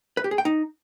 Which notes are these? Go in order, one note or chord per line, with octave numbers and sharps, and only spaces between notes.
B4
G4
G#4
G5
D#4